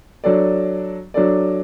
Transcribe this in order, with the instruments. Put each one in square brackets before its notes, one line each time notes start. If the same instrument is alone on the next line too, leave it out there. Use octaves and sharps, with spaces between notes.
[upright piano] F#3 D4 A4 D5
F#3 D4 A4 D5